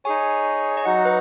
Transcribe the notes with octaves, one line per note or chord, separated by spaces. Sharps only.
D#4 G#4 C#5 G#5
D#5
F#3 D#4 F#4 F#5
B4